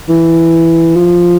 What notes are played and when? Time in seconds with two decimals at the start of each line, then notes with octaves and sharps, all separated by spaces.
0.09 E3
0.96 F3